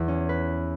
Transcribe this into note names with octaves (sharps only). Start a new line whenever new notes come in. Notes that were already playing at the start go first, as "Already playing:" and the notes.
Already playing: E2 E3
C#4
B4